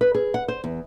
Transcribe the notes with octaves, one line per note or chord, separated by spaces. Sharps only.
B4
G#4
F#5
C5
E2